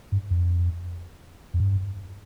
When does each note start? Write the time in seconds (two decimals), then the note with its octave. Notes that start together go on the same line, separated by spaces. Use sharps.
0.12 G2
0.30 F2
1.54 F2
1.60 G2